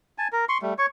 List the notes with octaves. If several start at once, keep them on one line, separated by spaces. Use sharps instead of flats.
G#5 A5
A#4
C6 C#6
G3 A3
C#5 C#6